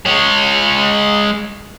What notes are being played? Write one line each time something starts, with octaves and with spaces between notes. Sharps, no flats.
G#3 C#5